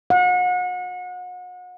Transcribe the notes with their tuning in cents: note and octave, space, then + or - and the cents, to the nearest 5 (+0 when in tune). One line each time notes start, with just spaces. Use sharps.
F#5 -35